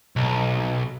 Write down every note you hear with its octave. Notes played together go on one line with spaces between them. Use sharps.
B1